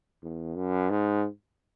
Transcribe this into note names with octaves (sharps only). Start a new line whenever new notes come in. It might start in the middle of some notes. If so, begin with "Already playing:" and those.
E2
F#2
G#2